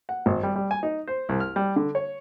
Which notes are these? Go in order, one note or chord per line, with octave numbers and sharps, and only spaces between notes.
F#5
G#1
G3
G3
G#5
D#4
C5
C2
F6
G3
D3
C#5